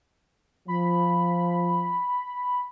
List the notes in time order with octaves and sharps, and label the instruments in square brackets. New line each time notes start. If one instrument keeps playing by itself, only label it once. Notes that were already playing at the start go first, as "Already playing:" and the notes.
[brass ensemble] F3 [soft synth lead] B5